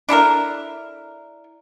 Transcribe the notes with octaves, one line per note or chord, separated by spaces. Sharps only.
D4 E4 A4 A#4